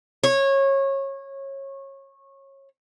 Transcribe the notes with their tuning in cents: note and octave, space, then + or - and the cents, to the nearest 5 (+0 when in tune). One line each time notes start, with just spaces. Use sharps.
C#5 -25